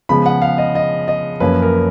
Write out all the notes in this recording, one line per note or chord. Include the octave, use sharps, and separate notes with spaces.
C#3 F3 G#3 B3 B5
F#5
F5
D#5
D#5
D#5
F#2 F3 A#3 C#4 B4
A#4